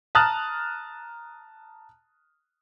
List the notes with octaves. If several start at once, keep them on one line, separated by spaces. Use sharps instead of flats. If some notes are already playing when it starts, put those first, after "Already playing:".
A5 A#5 D#6 F6 F#6 A6